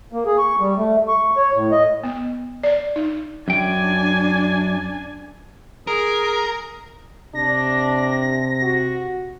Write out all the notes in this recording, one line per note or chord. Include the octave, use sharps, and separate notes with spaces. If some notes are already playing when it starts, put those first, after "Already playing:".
A#3
G#4
C#6
G3
A3
C#6
C#5
A2
D#5
B3
D5
D#4
F#2 D4 G5 G#5
G#4 A#4
C3 D4 A#6
F#4